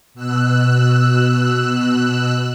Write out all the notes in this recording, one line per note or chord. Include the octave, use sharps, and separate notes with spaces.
B2 E6 F#6